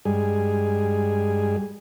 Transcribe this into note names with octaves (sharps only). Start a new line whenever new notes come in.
G2 G3 G#3 G#4